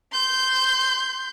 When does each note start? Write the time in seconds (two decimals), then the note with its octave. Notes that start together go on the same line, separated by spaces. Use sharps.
0.12 C6 G6